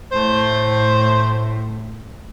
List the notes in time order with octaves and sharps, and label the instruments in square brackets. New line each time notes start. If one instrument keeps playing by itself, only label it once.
[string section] A2 [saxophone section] A3 C5